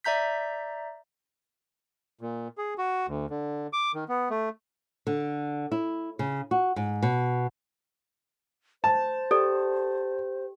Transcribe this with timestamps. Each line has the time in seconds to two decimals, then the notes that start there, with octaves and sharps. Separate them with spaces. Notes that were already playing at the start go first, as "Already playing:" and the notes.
0.04 D5 E5 A#5 G6 B6
2.21 A#2
2.58 G#4
2.78 F#4
3.08 D2
3.30 D3
3.73 D6
3.94 D#3
4.08 B3
4.30 A3
5.07 D3
5.72 E4
6.19 C#3
6.51 F#4
6.76 G#2
7.03 B2
8.84 C5 A5
9.31 G4 A4 D5